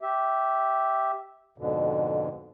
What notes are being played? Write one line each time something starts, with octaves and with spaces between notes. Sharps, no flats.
G4 E5
F2 G#2 B2 D3